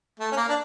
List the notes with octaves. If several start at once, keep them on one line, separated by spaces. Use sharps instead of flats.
A3
C#4
A#3
D4